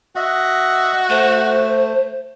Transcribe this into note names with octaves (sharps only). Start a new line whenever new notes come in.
F#4 D#5 E5
A3 C5